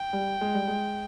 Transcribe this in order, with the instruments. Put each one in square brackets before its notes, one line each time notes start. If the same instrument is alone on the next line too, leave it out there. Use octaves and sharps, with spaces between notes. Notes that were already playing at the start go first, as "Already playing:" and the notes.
Already playing: [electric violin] G5
[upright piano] G3
G#3
G3
G#3